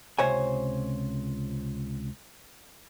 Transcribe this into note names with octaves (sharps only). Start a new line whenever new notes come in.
C#2 C3 C5 C#5 G#5